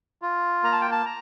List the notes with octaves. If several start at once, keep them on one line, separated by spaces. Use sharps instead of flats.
F4
A#3 A#5
A5
G5
A5
A#5